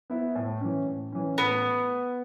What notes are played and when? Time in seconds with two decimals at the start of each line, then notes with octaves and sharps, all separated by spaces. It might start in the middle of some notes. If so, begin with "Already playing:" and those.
0.10 B3 E4 B4
0.35 A2
0.61 E3 C#4
0.86 A2
1.12 E3 C#4
1.38 A2 B3